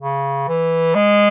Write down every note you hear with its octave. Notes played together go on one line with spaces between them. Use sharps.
C#3
E3
G#3